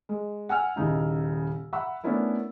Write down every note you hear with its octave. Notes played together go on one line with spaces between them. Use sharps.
G#3
F#5 G#5 E6 F6
D#1 C#3 D#4 E4
E5 F#5 A#5 B5 C#6 E6
A3 B3 C#4 D4 E4 A#4